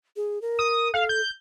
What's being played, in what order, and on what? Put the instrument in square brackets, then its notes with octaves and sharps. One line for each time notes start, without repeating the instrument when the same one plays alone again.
[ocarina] G#4
A#4
[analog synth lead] D#6
[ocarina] A4 [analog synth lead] F5
[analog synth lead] G6